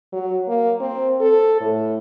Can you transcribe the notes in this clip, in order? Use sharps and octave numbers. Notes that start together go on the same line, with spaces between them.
F#3
A#3
C4
A4
A2